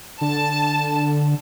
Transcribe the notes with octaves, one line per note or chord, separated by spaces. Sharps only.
D3 A5